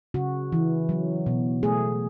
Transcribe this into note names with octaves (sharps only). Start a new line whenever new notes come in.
C#3 F#4
E3
F#3
B2
A3 G#4